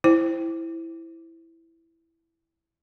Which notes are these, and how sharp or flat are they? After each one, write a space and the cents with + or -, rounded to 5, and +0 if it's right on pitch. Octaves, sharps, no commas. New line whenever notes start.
E4 +0 C5 +0